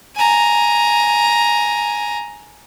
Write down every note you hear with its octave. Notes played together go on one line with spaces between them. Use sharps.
G#5 A#5